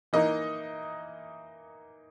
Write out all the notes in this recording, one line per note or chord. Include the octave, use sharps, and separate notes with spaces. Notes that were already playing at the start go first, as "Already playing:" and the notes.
E3 A#3 D#4 D#5